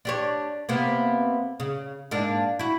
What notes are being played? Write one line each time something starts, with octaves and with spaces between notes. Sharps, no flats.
D4 G4 C#5
C3 A#3 B3
C#3
G#2 A#3 D4
E4 F#4